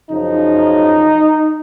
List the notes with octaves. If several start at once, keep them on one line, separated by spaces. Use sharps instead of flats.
F#2 C#3 F3 D#4